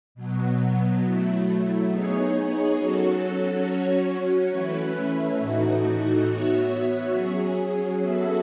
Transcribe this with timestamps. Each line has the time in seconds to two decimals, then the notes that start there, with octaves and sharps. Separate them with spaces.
0.15 B2 F#3 B3
1.02 F#3 A3 E4
1.90 B3 D#4 G#4 C#5
2.77 F#3 C#4 F#4 A4
3.64 F#3 C#4 F#4 C#5
4.51 E3 A3 C#4 E4 B4
5.39 A2 E3 A3 D#4 F#4
6.26 B3 F#4 C#5 E5
7.13 F#3 C#4 G#4
8.01 B3 F#4 A4 E5